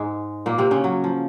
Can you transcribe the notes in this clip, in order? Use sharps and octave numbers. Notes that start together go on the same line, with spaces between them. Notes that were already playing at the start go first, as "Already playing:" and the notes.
Already playing: G#2 G#3
A#2 A#3
C3 C4
C#3 C#4
F#3
F3